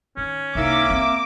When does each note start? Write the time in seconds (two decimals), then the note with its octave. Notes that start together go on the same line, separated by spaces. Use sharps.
0.17 D#3 C#4
0.55 C2 A#3 D#4 E5 D6
0.90 C4